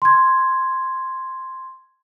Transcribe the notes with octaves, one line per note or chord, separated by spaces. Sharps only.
C6 G#6